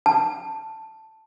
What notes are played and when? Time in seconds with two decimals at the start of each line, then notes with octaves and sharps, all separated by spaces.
0.06 A5